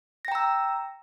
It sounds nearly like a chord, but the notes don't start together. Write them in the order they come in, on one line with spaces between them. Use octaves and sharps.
A#6 G5 A#5 E6